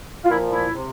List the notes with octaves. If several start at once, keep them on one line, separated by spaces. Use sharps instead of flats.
F4
A#2 F3 E4
E4
C3